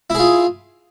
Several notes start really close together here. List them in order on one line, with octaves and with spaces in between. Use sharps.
E4 G#4 F4